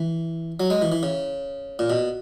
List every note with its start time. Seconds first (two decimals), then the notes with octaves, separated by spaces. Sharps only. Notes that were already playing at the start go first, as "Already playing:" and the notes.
Already playing: E3
0.60 F#3
0.70 G#3
0.82 E3
0.92 E3
1.03 C#3
1.79 A#2
1.90 B2